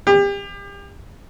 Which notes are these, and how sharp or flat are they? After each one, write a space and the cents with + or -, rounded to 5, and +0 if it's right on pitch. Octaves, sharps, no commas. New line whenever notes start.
G4 +35